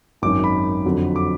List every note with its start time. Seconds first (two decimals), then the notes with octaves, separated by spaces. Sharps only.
0.22 G#1 F#2 D#3 D6
0.44 B5
0.85 F2 D3 F#3
1.16 D6